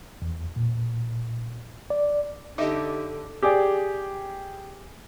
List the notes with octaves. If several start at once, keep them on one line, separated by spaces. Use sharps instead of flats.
E2
A#2
D5
D3 D#4 G4 D#5 E5 D6
G4 G#4 D5